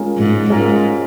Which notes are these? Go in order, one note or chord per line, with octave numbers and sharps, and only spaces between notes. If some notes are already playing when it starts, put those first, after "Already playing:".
Already playing: G#3 C#4 F4 A#4
G#2
G#2 G#3 C#4 F4 A#4